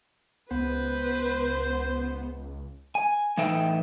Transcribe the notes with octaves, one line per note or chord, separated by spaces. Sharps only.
C#2 B3 B4 C5
G#5
A2 E3 D#4 B4 E5 G5